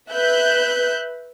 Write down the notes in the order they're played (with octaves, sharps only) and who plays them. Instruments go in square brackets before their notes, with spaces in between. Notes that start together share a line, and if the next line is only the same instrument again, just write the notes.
[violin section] B4 E5 F#6 G6